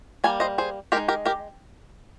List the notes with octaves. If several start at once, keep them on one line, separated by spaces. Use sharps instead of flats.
G3 A#3 G#5
C5 D#5
G#4 C5
G#3 D#4 G4 A#4
G4 A#4
G4 A#4